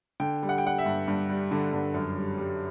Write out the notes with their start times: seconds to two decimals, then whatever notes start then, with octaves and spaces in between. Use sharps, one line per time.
0.20 D3 G5
0.43 G3
0.49 F#5
0.58 G5
0.64 G3 F#5
0.78 E5
0.86 G2
1.08 G2
1.29 G3
1.51 D3
1.73 G2
1.94 F#2
2.16 G3
2.38 G3